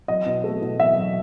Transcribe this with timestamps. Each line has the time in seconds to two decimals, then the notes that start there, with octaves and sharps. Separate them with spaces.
0.08 F#3 D#5
0.26 B2
0.44 A3
0.62 B2
0.79 F#3 E5
0.96 F#3